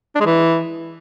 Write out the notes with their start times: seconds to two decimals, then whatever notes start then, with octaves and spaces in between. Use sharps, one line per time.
0.15 D4
0.20 G#3
0.26 E3